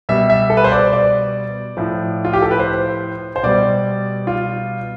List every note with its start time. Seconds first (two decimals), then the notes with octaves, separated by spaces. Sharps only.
0.09 B2 G3 E5
0.30 E5
0.50 A4
0.57 B4
0.64 C5
0.72 D5
0.93 D5
1.77 A2 F3
2.25 F4
2.33 G4
2.42 A4
2.51 B4
2.59 C5
3.36 C5
3.43 B2 G3 D5
4.27 F4